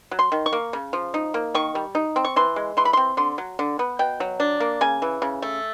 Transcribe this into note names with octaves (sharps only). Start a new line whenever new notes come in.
F#3
C6
D#3
C#6
A#3
C#3
F3
D#4
A#3
D#3 C#6
G3
D#4
C4
C#6
E3 C6
G#3
E3 C6
B5
C4 C6
D3 C6
F#3
D3
B3
B2 G5
F#3
D4
A#3
C#3 G#5
E3
C#3
A3